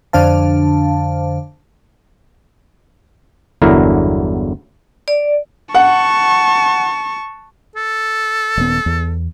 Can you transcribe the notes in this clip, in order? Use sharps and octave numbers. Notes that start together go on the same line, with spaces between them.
F2 D3 D4 C5 F5 A5
G1 E2 D3 F#3 E4 A#4
D5
F#5 A5 C#6
A4
D#1 B3
E2